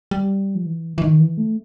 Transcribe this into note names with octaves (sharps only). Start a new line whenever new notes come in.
G3
F3
E3
E3
D#3
E3
A3